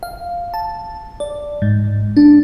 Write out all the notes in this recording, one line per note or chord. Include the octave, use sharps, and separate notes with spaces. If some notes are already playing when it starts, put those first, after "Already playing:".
F5
A5
D5
G#2
D4